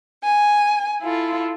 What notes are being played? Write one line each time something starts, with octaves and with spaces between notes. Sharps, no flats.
G#5
E4 F4 A4